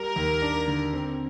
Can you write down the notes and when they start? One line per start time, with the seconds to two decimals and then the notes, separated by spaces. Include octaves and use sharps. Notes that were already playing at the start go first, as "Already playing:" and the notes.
Already playing: G3 A#4
0.16 D#2
0.42 D4
0.68 D3
0.94 C4